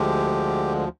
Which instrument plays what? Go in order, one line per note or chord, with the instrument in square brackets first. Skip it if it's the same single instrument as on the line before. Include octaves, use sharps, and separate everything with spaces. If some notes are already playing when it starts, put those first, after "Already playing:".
Already playing: [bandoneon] D2 D3 F3 G#3 G4